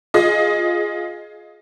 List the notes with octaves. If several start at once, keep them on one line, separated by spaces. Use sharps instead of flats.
F4 G#4 D#5